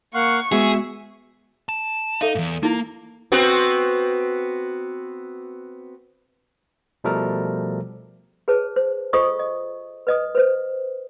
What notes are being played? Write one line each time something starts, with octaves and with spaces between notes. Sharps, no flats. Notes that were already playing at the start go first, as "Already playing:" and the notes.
A#3 F5 F#5 C#6
G#3 B3 F#4 G#4 E5
A5
D#4 A4 E5 F5
E2 G#2
A#3 D#4 E4
B3 C4 F#4
B2 F3 G3 A3 A4 A#4
G#4 B4 C#5 A5
C5
F4 A4 C5 D#5 C#6 D#6
D#5
B4 D#5 D#6
B4 C5